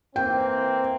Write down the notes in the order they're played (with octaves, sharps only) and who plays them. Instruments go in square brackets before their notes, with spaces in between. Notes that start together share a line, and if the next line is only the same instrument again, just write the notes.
[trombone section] E3 A#3 C4 [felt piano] G5